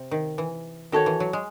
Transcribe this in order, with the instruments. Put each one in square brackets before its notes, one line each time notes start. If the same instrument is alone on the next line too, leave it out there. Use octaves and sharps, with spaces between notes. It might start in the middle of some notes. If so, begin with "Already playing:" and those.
Already playing: [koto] C3
D#3
E3
[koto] D#3 [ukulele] F#4 A4 C#5
[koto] E3
F#3
G#3